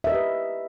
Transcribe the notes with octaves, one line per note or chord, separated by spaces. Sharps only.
G4 A#4 B4 D#5 E5